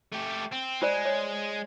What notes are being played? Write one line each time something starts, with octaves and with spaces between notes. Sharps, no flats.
A3 G4
C4
G#3 F4 C5 D5
C#5